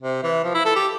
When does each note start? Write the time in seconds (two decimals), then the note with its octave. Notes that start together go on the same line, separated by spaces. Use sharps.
0.02 C3
0.23 E3
0.44 F3
0.54 E4
0.65 A4
0.76 G4